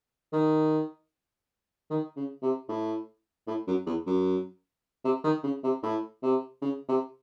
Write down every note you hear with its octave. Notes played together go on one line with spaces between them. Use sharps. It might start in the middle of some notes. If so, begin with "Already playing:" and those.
D#3
D#3
C#3
C3
A2
A2
F#2
E2
F#2
C3
D#3
C#3
C3
A2
C3
C#3
C3